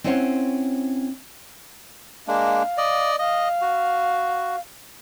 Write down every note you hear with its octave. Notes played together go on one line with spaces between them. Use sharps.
C4 C#4 E4 C5 C#5 F#5
G#3 A#3 D4 F5
D5 D#5
D#5 F5
F#4